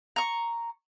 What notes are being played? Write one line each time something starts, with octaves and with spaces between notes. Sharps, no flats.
A#5 C#6